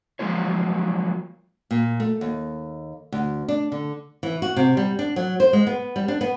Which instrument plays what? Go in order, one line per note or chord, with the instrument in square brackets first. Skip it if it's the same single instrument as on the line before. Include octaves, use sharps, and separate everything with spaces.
[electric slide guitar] F3 F#3 G#3 A#3 F4 C#5
[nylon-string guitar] A#2
A3
D#2
D2
D4
D3
E3
F#4
C3
G3
D4
F#3
C5
G#3
B3
G3
D4
B3